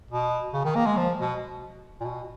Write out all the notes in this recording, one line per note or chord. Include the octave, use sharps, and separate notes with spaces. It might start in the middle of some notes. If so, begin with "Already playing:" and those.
B2
C#3
D#3
A#3
G#3
F3
B2
A#2
B2